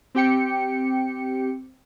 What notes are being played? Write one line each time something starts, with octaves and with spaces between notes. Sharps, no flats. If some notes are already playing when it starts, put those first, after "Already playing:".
C4 G4 G5 C#7